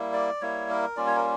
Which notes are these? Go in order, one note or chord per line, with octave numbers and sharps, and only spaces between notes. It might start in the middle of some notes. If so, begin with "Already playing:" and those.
Already playing: G3 A#3 E4
D5
G3 A#3 E4 C#5
A#4
G3 A#3 C#4 F4 D5
C#5
A#4